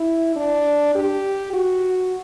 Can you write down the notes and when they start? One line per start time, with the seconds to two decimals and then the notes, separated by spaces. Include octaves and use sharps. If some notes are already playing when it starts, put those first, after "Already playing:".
Already playing: E4
0.36 D4
0.95 G4
1.54 F#4